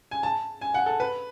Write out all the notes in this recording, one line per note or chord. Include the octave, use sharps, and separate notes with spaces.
G#5
A5
G#5
F#5
A4
B4